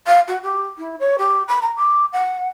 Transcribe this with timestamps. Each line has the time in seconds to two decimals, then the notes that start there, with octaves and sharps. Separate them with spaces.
0.07 F5
0.27 F#4
0.43 G4
0.78 E4
0.99 C#5
1.18 G4
1.47 B5
1.61 A#5
1.76 D6
2.12 F#5